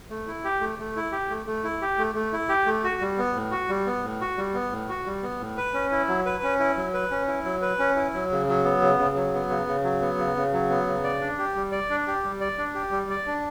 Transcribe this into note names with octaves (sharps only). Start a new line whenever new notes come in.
A3
E4
G4
A3
A3
E4
G4
A3
A3
E4
G4
A3
A3
E4
G4
A3
F#4
G3
B3
A2
F#4
G3
B3
A2
F#4
G3
B3
A2
F#4
G3
B3
A2
B4
C#4
E4
F#3
B4
C#4
E4
F#3
B4
C#4
E4
F#3
B4
C#4
E4
F#3
C#3
F#3
B3
C#3
C#3
F#3
B3
C#3
C#3
F#3
B3
C#3
C#3
F#3
B3
C#3
D5
D4
G4
G3
D5
D4
G4
G3
D5
D4
G4
G3
D5
D4